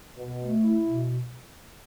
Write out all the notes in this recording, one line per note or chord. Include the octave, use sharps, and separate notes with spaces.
B2
A3
E4
B2